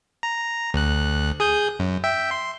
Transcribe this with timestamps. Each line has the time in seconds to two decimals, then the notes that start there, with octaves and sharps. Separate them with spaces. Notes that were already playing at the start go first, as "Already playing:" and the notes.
0.23 A#5
0.74 D2 F#6
1.40 G#4 D#6 G6
1.79 F#2
2.04 E5 G5
2.31 C6